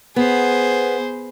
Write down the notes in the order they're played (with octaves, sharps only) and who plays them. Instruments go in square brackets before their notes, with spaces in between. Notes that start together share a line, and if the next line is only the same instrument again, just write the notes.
[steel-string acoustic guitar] B3 [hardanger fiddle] G#4 C5